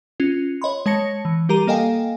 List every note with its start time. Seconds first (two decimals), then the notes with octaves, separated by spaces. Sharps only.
0.20 C#4 F4
0.62 C#5 D#5 B5 C6
0.86 G#3 C#5 A5 A#6 C#7
1.25 E3
1.49 G3 G4 A#4 A#5 D#7
1.67 A#3 A4 D#5 F5 G5 G#5